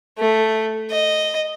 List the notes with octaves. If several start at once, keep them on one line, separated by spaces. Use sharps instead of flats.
A3
D#5